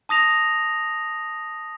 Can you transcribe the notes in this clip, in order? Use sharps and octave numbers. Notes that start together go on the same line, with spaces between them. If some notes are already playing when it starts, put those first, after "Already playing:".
A5 D#6 A#6 F7